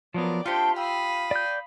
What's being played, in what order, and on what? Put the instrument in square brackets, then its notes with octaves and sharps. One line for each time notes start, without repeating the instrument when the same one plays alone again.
[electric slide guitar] F3 F#3 B3 [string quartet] A#4 D5
[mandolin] A3 C4 D4 [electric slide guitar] F4 G4 [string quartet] G5 C6
[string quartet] F5 B5 D#6 [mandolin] G5 E6
[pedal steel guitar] D5 G6